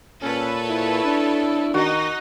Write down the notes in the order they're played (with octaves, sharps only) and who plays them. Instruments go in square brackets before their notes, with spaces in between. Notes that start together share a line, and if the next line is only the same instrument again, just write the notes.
[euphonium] A#2 [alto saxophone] C#4 [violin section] A4 B4 C#5
[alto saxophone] E4
[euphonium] D4
[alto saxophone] D#3 [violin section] D#4 [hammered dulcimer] F#4